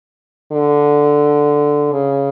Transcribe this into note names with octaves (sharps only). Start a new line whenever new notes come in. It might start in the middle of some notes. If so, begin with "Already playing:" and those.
D3
C#3